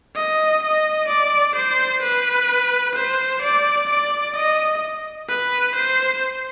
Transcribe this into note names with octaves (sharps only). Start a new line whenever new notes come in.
D#5
D#5
D5
C5
B4
C5
D5
D5
D#5
B4
C5